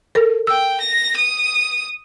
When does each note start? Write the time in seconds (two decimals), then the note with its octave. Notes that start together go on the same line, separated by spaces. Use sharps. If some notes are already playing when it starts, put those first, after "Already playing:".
0.15 A4 A#4
0.47 G5 E6
0.80 A#6
1.16 D#6